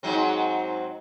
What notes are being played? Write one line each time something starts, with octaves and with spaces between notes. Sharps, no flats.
G#2 F#3 C4